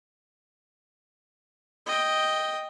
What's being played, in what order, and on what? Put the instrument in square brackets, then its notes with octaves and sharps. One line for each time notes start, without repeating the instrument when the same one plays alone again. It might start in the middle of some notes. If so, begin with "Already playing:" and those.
[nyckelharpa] D#5 G5